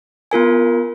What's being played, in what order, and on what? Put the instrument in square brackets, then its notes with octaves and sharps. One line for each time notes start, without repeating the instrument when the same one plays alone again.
[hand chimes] B3 F4 A#4 G#5